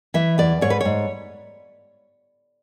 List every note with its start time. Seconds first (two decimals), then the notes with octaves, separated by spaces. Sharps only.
0.14 E3 E5
0.38 E2 D5
0.61 G#2 C#5
0.70 B4
0.81 G#2 C#5